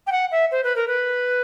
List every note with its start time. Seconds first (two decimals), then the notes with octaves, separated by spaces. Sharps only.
0.07 G5
0.11 F#5
0.31 E5
0.51 C5
0.64 B4
0.76 A#4
0.87 B4